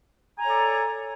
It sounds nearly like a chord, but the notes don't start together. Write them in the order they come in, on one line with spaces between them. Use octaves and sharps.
G#5 A#5 C#5 A4 D5